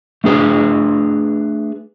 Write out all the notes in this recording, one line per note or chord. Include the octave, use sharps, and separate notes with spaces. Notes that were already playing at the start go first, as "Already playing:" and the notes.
A3 D4 G#4 B4